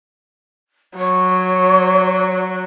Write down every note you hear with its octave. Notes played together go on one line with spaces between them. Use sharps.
F#3 C#5